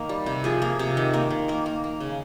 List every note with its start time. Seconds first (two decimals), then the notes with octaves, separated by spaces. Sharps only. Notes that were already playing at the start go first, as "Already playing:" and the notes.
Already playing: D#3 A#3
0.09 G3
0.26 C3
0.44 F3 G#4
0.62 A#3
0.79 C3
0.97 D#3
1.13 A#3
1.30 D#3
1.48 A#3 A#4
1.66 A#3
1.84 A#3
2.00 C#3